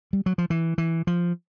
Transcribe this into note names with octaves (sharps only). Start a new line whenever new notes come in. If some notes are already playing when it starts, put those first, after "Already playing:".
G3
F#3
F3
E3
E3
F3